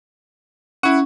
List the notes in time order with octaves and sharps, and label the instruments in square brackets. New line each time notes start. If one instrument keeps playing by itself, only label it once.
[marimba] C#4 [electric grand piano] E4 F#5